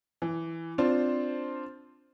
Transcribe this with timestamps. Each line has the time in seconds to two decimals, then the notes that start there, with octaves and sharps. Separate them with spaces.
0.22 E3
0.78 C4 D4 F4 C5